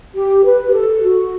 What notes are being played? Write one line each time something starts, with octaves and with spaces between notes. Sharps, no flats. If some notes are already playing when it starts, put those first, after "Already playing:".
G4
B4
G4
A4
G4
F#4